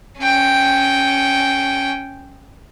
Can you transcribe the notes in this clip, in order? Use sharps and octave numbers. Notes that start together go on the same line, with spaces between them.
C#4 G5